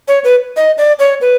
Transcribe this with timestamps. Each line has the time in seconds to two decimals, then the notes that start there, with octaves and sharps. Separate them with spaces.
0.08 C#5
0.24 B4
0.56 D#5
0.78 D5
0.99 C#5
1.21 B4